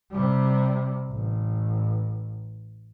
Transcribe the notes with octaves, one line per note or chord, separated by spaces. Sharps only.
C3 G3
A1